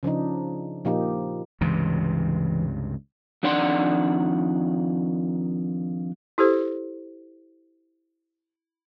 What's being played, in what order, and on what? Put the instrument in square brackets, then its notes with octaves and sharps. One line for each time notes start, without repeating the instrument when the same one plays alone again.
[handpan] C#3 F3 D4 D#4
A#2 F3 A#3 D#4 G4
[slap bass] C#2 G2 C3 [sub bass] E3
[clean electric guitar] F2 D#3 D4 D5 F#5 C6
[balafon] E4 G4 A4 C5